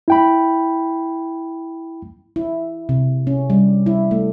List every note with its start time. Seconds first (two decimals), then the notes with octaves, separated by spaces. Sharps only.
0.08 E4 G5 B5
2.36 E4
2.89 C3
3.27 C#4
3.50 G3
3.86 E4
4.11 A3